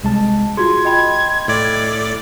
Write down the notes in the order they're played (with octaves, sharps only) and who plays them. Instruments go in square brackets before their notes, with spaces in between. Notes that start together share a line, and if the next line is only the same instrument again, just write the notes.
[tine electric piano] C2 G#3 A5
[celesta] F4 F#4 G#4 [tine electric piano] C6 [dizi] G#6
[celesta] D#5 G5 B5
[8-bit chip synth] A2 D5